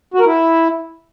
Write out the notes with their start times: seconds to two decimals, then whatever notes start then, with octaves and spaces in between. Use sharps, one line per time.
0.14 F#4
0.20 A#4
0.26 E4